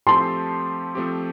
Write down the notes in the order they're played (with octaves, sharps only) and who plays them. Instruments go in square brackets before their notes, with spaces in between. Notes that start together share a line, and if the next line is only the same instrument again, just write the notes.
[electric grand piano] F3 A3 C4 G4 [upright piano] A5 C6
[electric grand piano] F3 A3 C4 G4